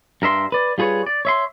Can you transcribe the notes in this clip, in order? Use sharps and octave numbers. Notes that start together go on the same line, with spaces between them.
G2 A#4 E5 C6
B4 D5
G3 F4 G#4 B4 C#5
D5
C#5 E5 C6